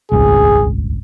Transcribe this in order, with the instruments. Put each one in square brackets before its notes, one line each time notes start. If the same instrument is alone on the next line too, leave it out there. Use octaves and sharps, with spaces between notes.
[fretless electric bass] D#1 G#1 C#2 [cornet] G#4